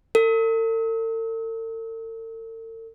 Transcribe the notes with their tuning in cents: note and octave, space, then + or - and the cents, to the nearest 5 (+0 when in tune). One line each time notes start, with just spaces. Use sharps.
A4 +45